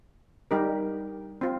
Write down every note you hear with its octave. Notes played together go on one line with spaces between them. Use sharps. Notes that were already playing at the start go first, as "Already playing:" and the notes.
G3 D#4 G4 A#4
C4 F4